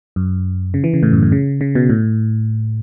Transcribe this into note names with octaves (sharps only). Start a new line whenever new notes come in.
F#2
C#3
E3
C#3
A2
F#2
A2
C#3
C#3
B2
A2